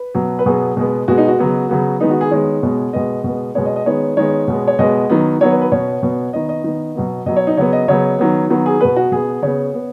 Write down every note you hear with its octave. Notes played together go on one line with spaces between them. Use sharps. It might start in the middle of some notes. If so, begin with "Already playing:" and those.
Already playing: B4
B2 F#3 B3
B4
B2 F#3 B3 G#4
B2 G#3 B3
B2 G#3 B3 F#4
D#4
F#4
C#3 F#3 B3
C#3 F#3 B3
D#3 G#3 B3 D#4
F#4
G#4
D#3 G#3 B3 C#5
B2 G#3 B3
B2 G#3 B3 D#5
B2 G#3 B3
B2 G#3 B3 C#5
D#5
D#5
D#3 G#3 B3 C#5
D#3 G#3 B3 C#5
B2 G#3 B3
C#5
B2 G#3 B3 D#5
D#3 F#3 B3
D#3 F#3 B3 C#5
B4
B4
B2 B3 C#5
B2 B3
D#3 B3 D#5
D#5
D#3 B3
B2 F#3 B3
B2 F#3 B3 D#5
C#5
D#4
C#3 F#3 B3 C#5
D#5
C#3 F#3 B3 C#5
D#3 F#3 B3
D#3 F#3 B3
G#4
B2 B3 B4
F#4
B2 B3 G#4
C#3 B3 C#5
B3